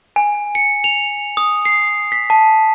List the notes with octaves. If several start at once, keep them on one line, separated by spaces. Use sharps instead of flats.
G#5
C#7
F7
D#6
C7
B6
A5